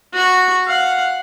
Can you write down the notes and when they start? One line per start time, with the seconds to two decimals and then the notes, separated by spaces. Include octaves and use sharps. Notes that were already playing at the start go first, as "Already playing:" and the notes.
0.13 F#4 C#6
0.67 F5 F#5